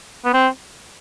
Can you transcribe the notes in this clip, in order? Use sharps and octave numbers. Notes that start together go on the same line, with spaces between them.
B3
C4